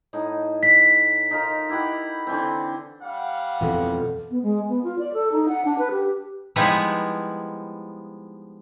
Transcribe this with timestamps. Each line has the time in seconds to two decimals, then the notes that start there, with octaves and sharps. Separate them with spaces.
0.13 A2 D#4
0.63 B6
1.31 D#4 F4 A#4
1.69 E4 G4 F#5
2.27 D3 E3 C4
3.02 G3 F5 F#5
3.61 F2 B2 E3 F4 A4
4.31 B3
4.43 G#3
4.69 B3
4.84 F4
4.99 D5
5.14 A4
5.32 D#4
5.49 F#5
5.65 D4
5.79 B4
5.91 G4
6.56 F3 G3 G#3 B3 D#4 E4